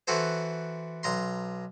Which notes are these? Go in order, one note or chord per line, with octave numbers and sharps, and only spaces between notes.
E3 F#4 A4 C5
B1 A#5 C6